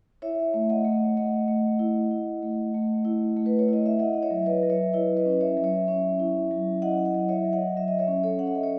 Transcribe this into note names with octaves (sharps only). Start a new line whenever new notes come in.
E4 C#5 E5
A3
D#5 F#5
A3
A3 D#5 F#5
A3
E4
E4
A3
A3
E4
A3
B4
C#5
E4 D#5
E5
E4 D#5 F#5
D#5
C#5 E5
F#3
B4 D#5
F#3
C#5 E5
E4 B4 D#5
B4 D#5
C#4
C#5 E5
F#3
C#5 E5
C#4
E4
F#3
E4 D#5 F#5
D#5 F#5
F#3
C#5 E5
F#3
D#5 F#5
F#3 E5
D#5
C#5 E5
C#4
A4 C#5
C#4 F#5
E5
D#5
C#5